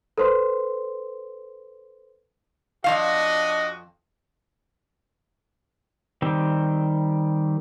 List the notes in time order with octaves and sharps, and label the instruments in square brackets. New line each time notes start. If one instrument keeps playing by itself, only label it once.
[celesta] A4 B4 C5 C6
[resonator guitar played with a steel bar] F2 D#3 F5 [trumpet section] D4 F#4 D#5
[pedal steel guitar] D#3 G3 C4